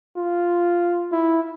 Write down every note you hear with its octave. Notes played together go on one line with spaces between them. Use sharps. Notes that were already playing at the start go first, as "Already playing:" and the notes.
F4
E4